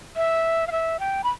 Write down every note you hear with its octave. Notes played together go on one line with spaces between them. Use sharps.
E5
F5
E5
G5
B5